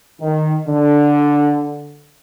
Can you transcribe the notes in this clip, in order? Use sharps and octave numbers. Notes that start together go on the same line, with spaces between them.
D#3
D3